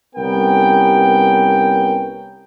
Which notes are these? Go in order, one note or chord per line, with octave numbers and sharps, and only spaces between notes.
C2 B3 C#4 A#4 G5